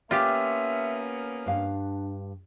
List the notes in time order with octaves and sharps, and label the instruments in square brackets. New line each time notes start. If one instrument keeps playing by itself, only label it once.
[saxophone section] A#3 B3 C#4 [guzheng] F4 G4 [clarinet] E5
[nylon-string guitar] G2 F5 [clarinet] D4